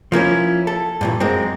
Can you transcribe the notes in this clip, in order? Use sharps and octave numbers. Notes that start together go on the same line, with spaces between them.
F3 A#3 C#4 E4
A4
G2 A#2 E3
F#2 G#3 A#3 C4